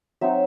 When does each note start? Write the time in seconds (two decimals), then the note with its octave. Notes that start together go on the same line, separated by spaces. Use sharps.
0.21 F#3 C4 D#4 E5